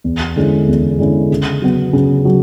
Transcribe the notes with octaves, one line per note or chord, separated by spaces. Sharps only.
E2
D3 G#3 C#4 E4
E2
D3 G#3 C#4 E4
C#3
F#3 B3
C#3
F#3